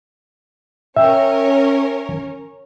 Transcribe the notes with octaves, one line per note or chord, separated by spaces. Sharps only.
C#4 A#4 C#5 E5 G5